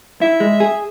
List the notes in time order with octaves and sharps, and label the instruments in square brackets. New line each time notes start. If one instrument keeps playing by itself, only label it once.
[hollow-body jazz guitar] E4 [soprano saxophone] E5
[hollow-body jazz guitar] G#3
G#4